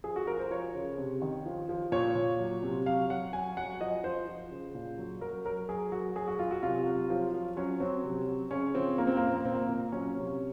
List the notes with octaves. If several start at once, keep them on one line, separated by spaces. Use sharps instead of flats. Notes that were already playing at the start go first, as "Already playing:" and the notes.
F3 G#4
F#4
F3 A#4
C5
F3 C#5
C#3
C3
D#3
F3
F3
A#2 C#5
A#2
F#3
C3
F#3 F5
F#3 F#5
F#3 G#5
F#3 F#5
F3 D#5
F3 C5
F3
C#3
A#2
F#3
F#3 A#4
F#3 A#4
F#3 G#4
F#3 F#4
F#3 G#4
F#4
F#3 F4
F#4
C3 F4
F#3
F3
F3
F#3 C#4
F#3 C4
C3
F#3
C#3 C#4
F3 C4
F3 A#3
C4
A#3
A#2 C4
A#3
A#2 C4
A#3
A#2
F#3 C#4
C3